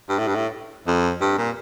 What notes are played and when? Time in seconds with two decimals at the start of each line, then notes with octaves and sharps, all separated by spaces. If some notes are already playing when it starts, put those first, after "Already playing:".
0.09 G2
0.19 A2
0.27 G2
0.35 A2
0.87 F2
1.21 G2
1.38 A#2